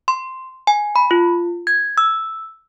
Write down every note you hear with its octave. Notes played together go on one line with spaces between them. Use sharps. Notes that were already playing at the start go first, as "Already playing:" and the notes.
C6
G#5
B5
F4
G#6
E6